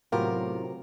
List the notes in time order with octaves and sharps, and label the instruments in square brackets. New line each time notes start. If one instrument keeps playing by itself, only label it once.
[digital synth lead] A2 [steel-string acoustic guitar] C3 A#4 [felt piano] F#3 [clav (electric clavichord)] B3 F4 G4